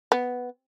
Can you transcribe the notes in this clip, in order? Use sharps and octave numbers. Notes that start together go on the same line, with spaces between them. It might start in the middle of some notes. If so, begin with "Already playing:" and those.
B3